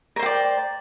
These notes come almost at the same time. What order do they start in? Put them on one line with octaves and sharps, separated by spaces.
A#4 C5 G5 D5